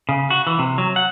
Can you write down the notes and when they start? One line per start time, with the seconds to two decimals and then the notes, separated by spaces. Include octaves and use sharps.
0.09 C#3
0.30 F#4
0.47 E3
0.59 C3
0.78 F#3
0.96 F#5